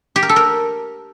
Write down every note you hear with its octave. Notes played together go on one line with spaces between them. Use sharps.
G4
A#4
A4
A#4